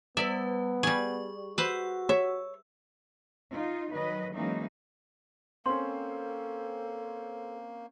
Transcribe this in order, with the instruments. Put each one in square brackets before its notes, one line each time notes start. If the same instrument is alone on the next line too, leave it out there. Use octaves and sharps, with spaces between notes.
[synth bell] G3 B4 [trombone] B3 [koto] D5 E5
[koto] G3 G#4 [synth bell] C#6
[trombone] F#4 [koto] B4 C5 [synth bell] E6
[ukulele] C#5 [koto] E5
[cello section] D#4 F4
D#3 F#3 B4 D#5
E3 F#3 G#3 A#3 C#4 D#4
[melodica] A#3 [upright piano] C4 C#4 [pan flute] A4 [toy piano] C6